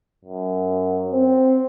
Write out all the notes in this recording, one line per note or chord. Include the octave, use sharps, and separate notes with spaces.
F#2
C4